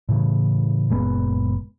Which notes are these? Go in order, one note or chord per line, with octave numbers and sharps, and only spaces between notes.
A2 C#3 E3
F#1 A#2 G#3 B3